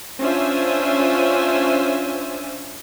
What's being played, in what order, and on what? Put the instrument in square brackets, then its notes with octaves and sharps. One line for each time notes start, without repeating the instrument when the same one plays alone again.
[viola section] C#4 D4 F4 C5 E5 G#5